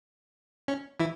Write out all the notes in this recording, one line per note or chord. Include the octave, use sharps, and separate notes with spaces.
C#4
E3 E4